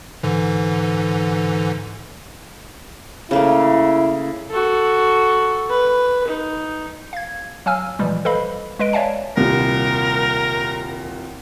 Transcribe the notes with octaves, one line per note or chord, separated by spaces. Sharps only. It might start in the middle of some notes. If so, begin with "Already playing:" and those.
G#2 D3 E3
C#3 A3 A#3 E4
F#4 A4
B4
D#4
F5 G#6
F#3 F5 G#5 E6 F6
A#2 E3 F3 G3 G#3
A4 B4 C5 D#5 F5 B5
G#3 B4 D#5 D7
C#5 D5 E5 F5 G#5 A5
D#1 C2 A#4